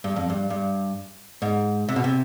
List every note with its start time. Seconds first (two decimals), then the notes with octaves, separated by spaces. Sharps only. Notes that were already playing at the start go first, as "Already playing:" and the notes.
0.04 G2
0.16 F2
0.30 G2
0.50 G2
1.42 G#2
1.89 C3
1.96 B2
2.04 C3